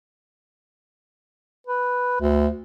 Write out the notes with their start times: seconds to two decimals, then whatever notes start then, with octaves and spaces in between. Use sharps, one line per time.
1.67 B4
2.21 D2